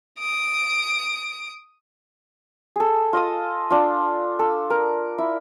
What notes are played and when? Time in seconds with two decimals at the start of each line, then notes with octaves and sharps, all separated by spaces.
0.19 D#6 D7
2.76 G#4 A4
3.13 F4 D#5 A5 D#6
3.70 D4 F4
4.39 A4
4.70 A#4
5.18 E4